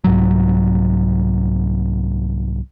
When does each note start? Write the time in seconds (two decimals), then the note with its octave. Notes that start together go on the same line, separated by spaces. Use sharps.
0.04 C2 G#2 F#3